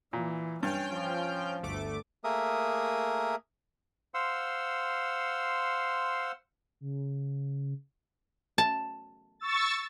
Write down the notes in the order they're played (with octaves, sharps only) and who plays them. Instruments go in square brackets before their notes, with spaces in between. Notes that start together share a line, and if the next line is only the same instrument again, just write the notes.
[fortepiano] A#2 [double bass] E3
[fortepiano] G2 [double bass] C#4 [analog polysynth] G5 F6 G6
[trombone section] F3
[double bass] G1 [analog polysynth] D2 A3 D6
[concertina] A3 A#3 G#4 A#4 E5 D#6
C5 F5 F#5 C6 E6
[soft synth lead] C#3
[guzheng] A5
[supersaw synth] C#6 E6 A6